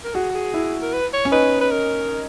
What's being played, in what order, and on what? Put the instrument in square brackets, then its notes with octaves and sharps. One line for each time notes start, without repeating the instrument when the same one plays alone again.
[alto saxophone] A#4
[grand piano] F#4 [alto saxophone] G#4
[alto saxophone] G#4
[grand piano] E4
[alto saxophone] A#4
B4
C#5
[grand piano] C#4
[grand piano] D#4 [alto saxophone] B4
[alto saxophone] B4
A#4